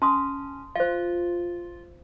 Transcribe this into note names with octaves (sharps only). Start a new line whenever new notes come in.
C#4 A5 C6 D#6
F4 C5 F5